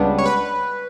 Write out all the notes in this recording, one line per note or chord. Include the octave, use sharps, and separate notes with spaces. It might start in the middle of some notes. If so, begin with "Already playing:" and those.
Already playing: C#2 C#3 G3 B3 D4
C#5
B4